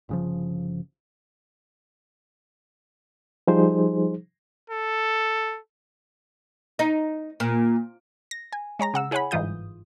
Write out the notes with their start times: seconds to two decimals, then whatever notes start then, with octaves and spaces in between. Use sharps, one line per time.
0.09 G1 C#3 F3
3.47 F3 G3 D#4 G#4 C5
4.70 A4
6.79 D#4
7.40 A#2
8.31 A#6
8.53 G#5
8.79 G#3 C#5 A#5 A#6
8.94 C#3 F#5 E6
9.11 E4 G#4 C#5 F#5 G#5 B5
9.31 G1 G#2 E3 F4 D#6 G6